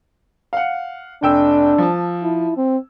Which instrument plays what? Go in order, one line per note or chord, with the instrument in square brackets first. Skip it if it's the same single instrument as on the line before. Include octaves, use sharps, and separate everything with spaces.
[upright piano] F5 F#5
[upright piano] F1 G5 E6 [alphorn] D4
[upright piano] F3 A5
[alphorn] E4
C4